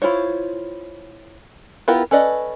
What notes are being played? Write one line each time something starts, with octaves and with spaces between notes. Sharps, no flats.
E4 F4 C5 C#5
B3 E4 F4 G4 A#4
C#4 A4 B4 D5 D#5